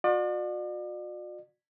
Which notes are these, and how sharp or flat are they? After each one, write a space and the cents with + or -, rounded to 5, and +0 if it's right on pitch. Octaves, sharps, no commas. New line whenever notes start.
F#4 -45 D5 +40